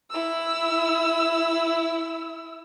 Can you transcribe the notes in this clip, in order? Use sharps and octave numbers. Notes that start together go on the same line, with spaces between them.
E4 E6